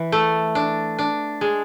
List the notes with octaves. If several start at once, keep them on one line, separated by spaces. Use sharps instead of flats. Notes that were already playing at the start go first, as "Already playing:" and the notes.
Already playing: E3
A3
D4
D4
G#3